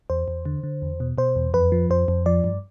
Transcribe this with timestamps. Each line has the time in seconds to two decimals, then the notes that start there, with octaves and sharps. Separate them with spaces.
0.10 E2 C5
0.28 E2
0.45 D3
0.64 D3
0.82 E2
1.00 B2
1.18 B2 C5
1.36 E2
1.54 F2 B4
1.72 F3
1.90 F2 C5
2.08 F2
2.26 F3 D5
2.44 G2